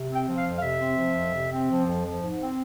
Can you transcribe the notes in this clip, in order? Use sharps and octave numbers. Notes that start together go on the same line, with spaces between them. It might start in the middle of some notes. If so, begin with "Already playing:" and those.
Already playing: C3
C4 G5
F3
F5
F2
F5
C3 E5
C4
F3
F2
C3
C4
F3
F2
F3
G#2
C4